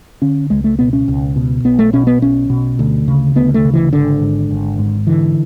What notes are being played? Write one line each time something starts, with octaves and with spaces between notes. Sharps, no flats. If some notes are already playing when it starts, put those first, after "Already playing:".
D3 C#4
C#2 G#3
A3
B2 B3
C#4
C#2
B2
B1 B3
A3
B2 C#4
B3
B1 C#4
B2
D2
C#3
D2 B3
A3
C#3
E3
G#1 D3
G#2
G#1
G#2
D3 E3